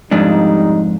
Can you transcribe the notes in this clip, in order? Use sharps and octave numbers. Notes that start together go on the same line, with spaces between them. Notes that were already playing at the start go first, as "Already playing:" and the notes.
F2 G#2 G3 D4 D#4